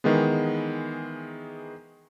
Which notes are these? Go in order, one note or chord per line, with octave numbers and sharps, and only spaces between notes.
D#3 E3 G#3 B3